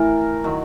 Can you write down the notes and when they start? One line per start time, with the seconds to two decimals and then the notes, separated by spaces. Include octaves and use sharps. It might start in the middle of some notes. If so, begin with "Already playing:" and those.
Already playing: A2 E3 A#4
0.44 D#3 F#3